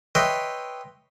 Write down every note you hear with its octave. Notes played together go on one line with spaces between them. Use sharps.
B4 C#5 D#5 E5 G5 C6